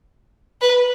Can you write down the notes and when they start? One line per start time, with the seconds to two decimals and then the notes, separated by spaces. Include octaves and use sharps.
0.61 B4